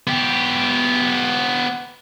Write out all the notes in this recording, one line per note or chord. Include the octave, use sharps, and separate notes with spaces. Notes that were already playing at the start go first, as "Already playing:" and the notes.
B3 G4